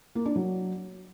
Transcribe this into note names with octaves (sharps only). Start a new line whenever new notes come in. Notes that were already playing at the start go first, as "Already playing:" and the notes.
A#3
D4
F#3